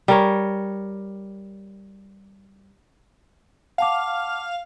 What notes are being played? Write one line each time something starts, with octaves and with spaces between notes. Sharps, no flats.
G3 A#4 C#5
F5 F#5 A5 D6